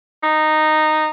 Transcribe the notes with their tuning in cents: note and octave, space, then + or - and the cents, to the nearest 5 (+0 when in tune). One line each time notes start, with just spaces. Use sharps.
D#4 -10